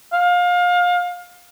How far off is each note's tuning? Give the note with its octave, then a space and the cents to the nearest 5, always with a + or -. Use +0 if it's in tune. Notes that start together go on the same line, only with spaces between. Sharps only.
F5 +25